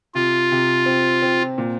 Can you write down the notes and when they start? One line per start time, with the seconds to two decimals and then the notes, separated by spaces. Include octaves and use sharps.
0.15 C3 F4
0.51 C3
0.86 C4
1.22 C4
1.58 A#2